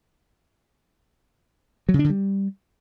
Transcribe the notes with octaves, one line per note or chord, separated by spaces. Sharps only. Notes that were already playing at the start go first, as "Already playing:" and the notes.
F#3
C#3
D4
D3
G3